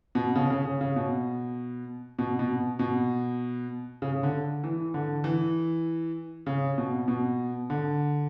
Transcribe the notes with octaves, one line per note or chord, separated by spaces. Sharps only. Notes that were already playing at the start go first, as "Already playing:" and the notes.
B2
C#3
C#3
C#3
C#3
B2
B2
B2
B2
C#3
C#3
D3
E3
D3
E3
C#3
B2
B2
D3